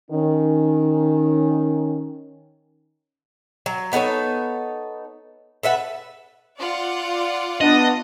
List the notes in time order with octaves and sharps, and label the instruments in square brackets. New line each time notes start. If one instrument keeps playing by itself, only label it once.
[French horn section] D#3 C#4
[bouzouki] F#3
B3 D#4 A4 C#5
A4 B4 E5 F#5
[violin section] F4 D5 F#5
[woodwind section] B3 D4 [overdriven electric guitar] D#5